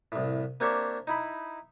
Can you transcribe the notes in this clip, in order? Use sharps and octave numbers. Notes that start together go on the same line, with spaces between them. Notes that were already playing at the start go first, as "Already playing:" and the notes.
C2 A2
A#3 C4 D4 G4 C#5 E5
D#4 E4 B5